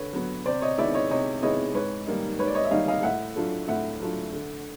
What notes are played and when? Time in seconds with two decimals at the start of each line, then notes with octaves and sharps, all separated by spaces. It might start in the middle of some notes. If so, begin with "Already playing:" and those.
Already playing: D3 B4 C#5
0.13 F#3 B3
0.46 C3 C5 D5
0.62 C#5 D#5
0.78 D#3 G#3 B3 E4 D5 E5
0.94 C#5 D#5
1.11 C3 C#5 D#5
1.42 D#3 G#3 B3 E4 C#5 D#5
1.74 G#2 B4 C#5
2.07 D#3 G3 A#3 D#4
2.39 G#2 B4 C#5
2.47 D5
2.55 C#5 D#5
2.64 E5
2.71 D#3 G3 A#3 D#4 D#5 F5
2.88 D#5 F5
3.03 A2 E5 F#5
3.36 F#3 A3 D4 F4
3.68 A2 E5 F#5
4.00 F#3 A3 D4 F4
4.33 D3